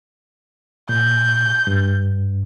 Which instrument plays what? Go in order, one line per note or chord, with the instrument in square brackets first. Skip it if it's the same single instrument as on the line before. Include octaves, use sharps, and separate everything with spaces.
[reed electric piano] A#2 [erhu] G6
[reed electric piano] G2